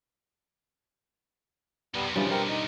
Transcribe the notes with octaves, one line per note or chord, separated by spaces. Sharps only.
B1 C3 G3 B3
C#3 E3 F3 G3 D4
C4 A#4 A#5
D#4